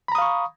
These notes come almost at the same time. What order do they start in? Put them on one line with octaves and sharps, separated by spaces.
B5 A#5 D#6 F5 C#6